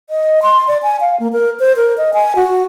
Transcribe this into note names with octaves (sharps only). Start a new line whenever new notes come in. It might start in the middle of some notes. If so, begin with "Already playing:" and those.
D#5
C6
D5
G#5
F5
A#3
A#4
C5
A#4
D#5
G#5
F#4